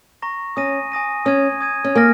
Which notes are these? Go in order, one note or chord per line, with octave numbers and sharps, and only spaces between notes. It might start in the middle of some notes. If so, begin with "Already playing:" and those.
A#5 C#6 A#6
C#4 G#5 D#6 A#6 D#7
G#5 D#6 A#6 D#7
C#4 D#6 G#6 D#7
D#6 G#6 D#7
C#4
A#3 G#5 F6 A#6